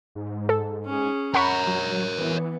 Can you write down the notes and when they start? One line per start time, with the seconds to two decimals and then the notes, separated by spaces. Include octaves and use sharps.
0.15 G#2
0.49 A4
0.86 C#4 G#4
1.35 A#4 C#5 F#5 A#5 B5 C#6
1.67 F#3
2.18 E3 B3